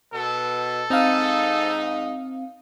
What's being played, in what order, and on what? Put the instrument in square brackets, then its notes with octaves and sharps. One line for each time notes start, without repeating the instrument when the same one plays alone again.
[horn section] B2 [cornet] A4
[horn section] G#2 D#4 [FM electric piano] C4 F5